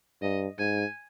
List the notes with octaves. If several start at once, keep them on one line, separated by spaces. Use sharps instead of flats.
G2 D#5
G#2 G#5